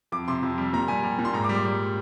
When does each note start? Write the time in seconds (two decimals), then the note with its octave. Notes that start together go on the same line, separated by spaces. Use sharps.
0.12 F2 D6
0.28 C3 C6
0.43 F2
0.58 G3
0.73 A#2 A#5
0.88 G3 G#5
1.03 G3
1.19 A#2
1.25 C6
1.34 G#2 A#5
1.44 D6
1.49 G3
1.55 D6
1.65 G3